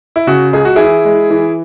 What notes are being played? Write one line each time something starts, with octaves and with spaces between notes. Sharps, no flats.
E4
C#3 F#4
C#2 G#4
F#4
E3 E4 G#4
G#3
E3